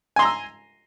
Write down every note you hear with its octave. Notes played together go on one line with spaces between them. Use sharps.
G#5 A#5 C6 E6